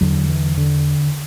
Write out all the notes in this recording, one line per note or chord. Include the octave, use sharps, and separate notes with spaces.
E2 D3 F#3
E3
D3